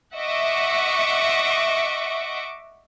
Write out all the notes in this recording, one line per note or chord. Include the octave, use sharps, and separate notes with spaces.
D#5 E5 F#5 C#6 D6